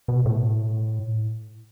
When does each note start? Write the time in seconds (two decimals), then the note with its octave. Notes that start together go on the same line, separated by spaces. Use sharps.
0.08 B2
0.26 A2